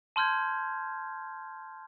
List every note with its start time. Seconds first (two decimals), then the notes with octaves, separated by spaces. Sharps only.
0.16 A5 C6 F6 G6 G#6